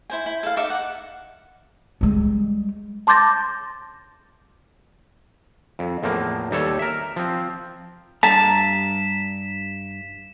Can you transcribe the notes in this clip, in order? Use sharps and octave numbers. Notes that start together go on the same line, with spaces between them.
E4 C5 G#5
E4
A4 F5
D#4 A4 E5 D6
F#5
G3 G#3
A5 C6 D6 G6 A6 A#6
F2
E2 A2 F3 A#3
D#2 G3 A4 C#5
A#4 E5
F3 C4
G2 A5 A#5 B6 E7